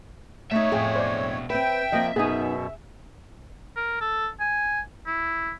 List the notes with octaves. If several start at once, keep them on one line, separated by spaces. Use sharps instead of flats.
B2 A3 D#4 C#5 E5
F2 A2 G#4 G5 G#5
C5 D5
C4 B4 E5 G5
F3 A#3 C4 D#5
F#2 B2 B3 D#4 G#4 G#5 D#6
A#4
A4
G#5
E4